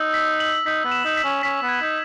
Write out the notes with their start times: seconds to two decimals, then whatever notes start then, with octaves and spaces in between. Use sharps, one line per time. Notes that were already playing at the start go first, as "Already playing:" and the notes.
Already playing: D#4 E6
0.14 B6
0.40 F#7
0.66 D#4 B6
0.85 B3
0.92 E7
1.05 D#4
1.17 B6
1.24 C#4
1.43 C#4 B6
1.63 B3
1.69 G#6
1.82 D#4